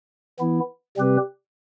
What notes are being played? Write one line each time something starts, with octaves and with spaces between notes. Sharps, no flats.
E3 B3 E4
C3 G3 C4 G4 B4